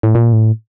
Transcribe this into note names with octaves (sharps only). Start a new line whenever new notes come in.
A2
A#2
A2